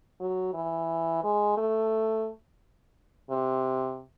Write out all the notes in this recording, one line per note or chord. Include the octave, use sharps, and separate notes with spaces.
F#3
E3
G#3
A3
C3